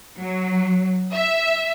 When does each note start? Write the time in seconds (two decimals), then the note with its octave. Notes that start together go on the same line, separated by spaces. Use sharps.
0.18 F#3
1.14 E5